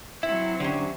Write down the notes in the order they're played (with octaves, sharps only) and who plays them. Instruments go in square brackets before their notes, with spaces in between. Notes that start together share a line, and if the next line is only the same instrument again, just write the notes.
[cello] F#3 C4 [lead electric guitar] E4 [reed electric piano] E5
[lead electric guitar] D3 [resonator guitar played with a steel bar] C#4 G4 C5